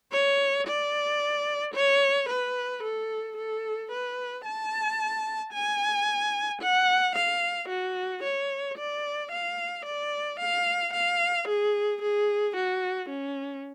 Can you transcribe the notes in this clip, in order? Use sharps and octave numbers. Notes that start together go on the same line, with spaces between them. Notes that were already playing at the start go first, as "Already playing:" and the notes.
C#5
D5
C#5
B4
A4
A4
B4
A5
G#5
F#5
F5
F#4
C#5
D5
F5
D5
F5
F5
G#4
G#4
F#4
C#4